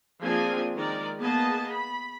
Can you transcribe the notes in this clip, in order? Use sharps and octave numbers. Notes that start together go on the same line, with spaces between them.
F3 A#3 C4 D4 G#4 G#5
D#3 G#3 A#4 D5
A#3 B3 G#4 D#5 A5
B5